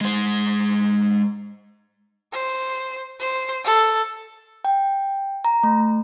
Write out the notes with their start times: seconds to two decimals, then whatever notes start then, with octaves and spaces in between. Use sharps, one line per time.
0.01 G#3 C5
2.33 C5
3.20 C5
3.65 A4
4.65 G5
5.45 A#5
5.63 A3